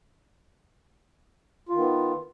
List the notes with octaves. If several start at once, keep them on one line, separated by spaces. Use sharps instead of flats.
D#3 B3 F4